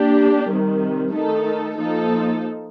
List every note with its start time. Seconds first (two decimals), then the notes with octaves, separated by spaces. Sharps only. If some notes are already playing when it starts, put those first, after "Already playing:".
Already playing: A#3 D4 G4
0.49 C3 D#3 G3
1.14 D#3 A3 D#4 A4
1.78 F3 A#3 D#4 A4